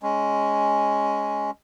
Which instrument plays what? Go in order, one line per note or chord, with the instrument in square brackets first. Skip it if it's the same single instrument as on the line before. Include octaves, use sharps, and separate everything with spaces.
[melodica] G#3 C#4